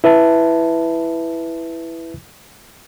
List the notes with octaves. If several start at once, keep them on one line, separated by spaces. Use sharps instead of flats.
E4 B4 E5 A5